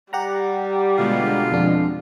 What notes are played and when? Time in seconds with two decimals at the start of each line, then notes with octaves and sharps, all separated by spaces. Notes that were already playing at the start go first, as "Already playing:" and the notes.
0.13 G3 G4 F#5 A#5
0.98 B2 D3 G#3 F4
1.52 F2 D4